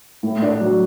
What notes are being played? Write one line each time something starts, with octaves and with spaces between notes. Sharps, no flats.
A2
D4
F#3